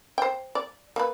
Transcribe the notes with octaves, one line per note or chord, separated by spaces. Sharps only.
C5 G5
D5
A#3 B4